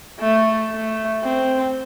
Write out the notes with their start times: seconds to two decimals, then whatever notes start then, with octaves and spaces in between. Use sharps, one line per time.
0.20 A3
0.71 A3
1.24 C4